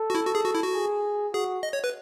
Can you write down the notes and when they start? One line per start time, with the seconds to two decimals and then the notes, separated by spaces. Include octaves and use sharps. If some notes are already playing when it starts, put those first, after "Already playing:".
Already playing: A4
0.10 F#4
0.15 E4
0.25 F#4
0.35 G#4
0.45 F#4
0.55 E4
0.64 F#4
0.74 G#4
1.34 F#4 G#4
1.63 D#5
1.73 C#5
1.84 B4